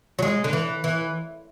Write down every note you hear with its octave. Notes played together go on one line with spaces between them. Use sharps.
F#3
G#3
D3
E3
E3